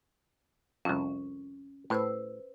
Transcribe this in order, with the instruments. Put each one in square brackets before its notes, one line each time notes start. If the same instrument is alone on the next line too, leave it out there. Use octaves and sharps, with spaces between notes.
[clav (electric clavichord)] C2 F2 [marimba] C#4
[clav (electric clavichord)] A2 [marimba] B4 C5 E6